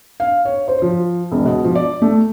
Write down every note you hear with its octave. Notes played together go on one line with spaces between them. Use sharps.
F5
C#5
C5
F3
E1
B2
F3
D5
A3